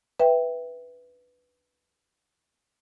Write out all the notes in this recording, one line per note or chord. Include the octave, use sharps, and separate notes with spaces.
B4 E5 G5